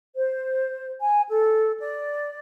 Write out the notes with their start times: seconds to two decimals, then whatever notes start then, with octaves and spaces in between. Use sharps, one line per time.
0.14 C5
1.00 G#5
1.28 A4
1.79 D5